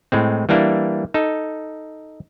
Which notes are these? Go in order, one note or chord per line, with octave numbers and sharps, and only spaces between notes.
A2 G#3 C4
E3 G3 A#3 D4 E4
D#4 A4